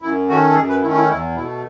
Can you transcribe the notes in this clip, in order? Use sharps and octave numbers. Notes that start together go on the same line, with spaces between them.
F#2 E4
D#3 A3 C#4 F#4
A4
F#2 G#4
B4
D#3 A3 C#4 E4
E4
E2 E4
B2 A3 E4